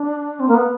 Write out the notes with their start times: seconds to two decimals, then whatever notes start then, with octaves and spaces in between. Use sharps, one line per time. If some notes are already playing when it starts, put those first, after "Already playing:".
Already playing: D4
0.40 C4
0.48 A#3
0.55 B3